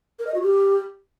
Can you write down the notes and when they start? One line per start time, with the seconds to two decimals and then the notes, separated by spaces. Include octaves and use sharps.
0.19 A#4
0.27 D#5
0.34 F#4
0.42 G4